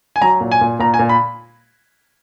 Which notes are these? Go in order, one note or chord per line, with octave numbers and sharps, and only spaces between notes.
G#5
F#3 A#5
A#2
G#5
A#2
A#2 A#5
G#5
A#2
B5